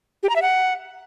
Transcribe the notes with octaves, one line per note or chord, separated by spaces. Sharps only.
G4
A#5
E5
F#5